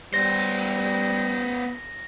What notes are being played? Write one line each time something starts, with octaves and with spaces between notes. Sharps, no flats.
G3 B3 C5 A#6